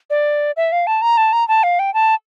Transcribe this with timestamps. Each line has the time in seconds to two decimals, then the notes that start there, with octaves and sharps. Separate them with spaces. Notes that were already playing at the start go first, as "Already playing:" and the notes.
0.10 D5
0.57 E5
0.72 F5
0.87 A5
1.02 A#5
1.17 A5
1.33 A#5
1.48 A5
1.63 F5
1.79 G5
1.94 A5